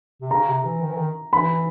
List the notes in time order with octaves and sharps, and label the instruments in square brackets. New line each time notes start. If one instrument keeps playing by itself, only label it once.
[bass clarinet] C3
[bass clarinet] C#3 [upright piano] A#5
[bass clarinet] C3
E3
D#3
E3
D#3
[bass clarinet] E3 [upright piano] B5